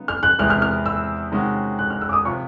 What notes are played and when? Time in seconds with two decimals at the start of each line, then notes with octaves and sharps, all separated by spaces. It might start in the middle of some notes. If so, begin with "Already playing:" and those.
Already playing: C#3 F#3 B3 D#4
0.08 F6
0.23 F#6
0.39 E2 C3 E3 G#3 F6
0.50 F6
0.62 F6
0.86 E6
1.32 C3 D#3 G#3 C#4 F#4
1.79 F#6
1.90 F6
2.01 E6
2.09 D6
2.13 D#6
2.25 C3 F3 C#6